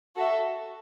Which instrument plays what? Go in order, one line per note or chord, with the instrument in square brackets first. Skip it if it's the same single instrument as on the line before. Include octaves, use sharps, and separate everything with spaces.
[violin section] F#4 A4 E5